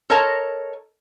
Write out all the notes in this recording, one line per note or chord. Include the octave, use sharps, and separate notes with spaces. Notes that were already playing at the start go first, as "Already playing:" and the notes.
A4 A#4 C#5 D#5 A5 A#5